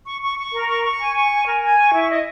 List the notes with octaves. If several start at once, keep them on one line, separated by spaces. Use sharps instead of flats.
C#6
C#6
C#6
A#4
C#6
C#6
G#5
C#6
G#5
A#4
G#5
C#6
E4
D#5